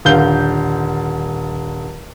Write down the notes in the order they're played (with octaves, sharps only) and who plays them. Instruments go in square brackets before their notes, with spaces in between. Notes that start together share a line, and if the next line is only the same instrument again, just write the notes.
[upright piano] D#1 D3 F5 G6 G7